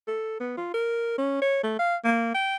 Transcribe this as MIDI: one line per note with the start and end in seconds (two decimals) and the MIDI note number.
0.08 0.39 69
0.40 0.55 59
0.57 0.70 65
0.74 1.17 70
1.18 1.40 61
1.42 1.60 73
1.63 1.75 57
1.79 1.96 77
2.04 2.30 58
2.34 2.56 79